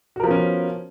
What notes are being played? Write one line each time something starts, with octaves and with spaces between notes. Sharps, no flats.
F3 B3 C#4 F#4 A#4